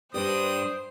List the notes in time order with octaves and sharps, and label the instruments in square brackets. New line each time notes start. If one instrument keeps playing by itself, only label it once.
[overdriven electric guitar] G2 D4 [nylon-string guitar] G4 B4 D5 [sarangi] C5 [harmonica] D#6